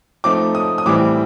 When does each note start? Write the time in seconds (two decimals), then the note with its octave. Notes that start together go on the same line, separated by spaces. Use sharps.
0.24 F3 A3 C4 D#4 D6
0.55 D#6
0.78 D#6
0.85 A2 E3 G3 C4 D6